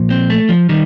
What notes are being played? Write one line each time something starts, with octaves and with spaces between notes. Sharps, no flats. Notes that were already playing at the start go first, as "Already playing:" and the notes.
Already playing: A#2 F3
C4
A3
F3
D#3 G3